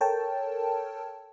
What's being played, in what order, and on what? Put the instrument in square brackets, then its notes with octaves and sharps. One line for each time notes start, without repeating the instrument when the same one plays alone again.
[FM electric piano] A4 A#4 C#5 G5 A5